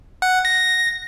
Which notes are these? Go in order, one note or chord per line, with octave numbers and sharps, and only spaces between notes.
F#5
A#6